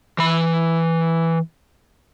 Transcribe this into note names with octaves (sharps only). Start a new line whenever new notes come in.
E3 B5